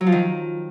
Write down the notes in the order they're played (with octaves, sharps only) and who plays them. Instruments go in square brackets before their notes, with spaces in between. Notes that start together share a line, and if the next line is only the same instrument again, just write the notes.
[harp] F#3
F3
D#3